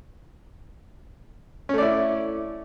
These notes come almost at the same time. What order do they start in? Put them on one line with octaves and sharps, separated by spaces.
C#4 A3 D5 E4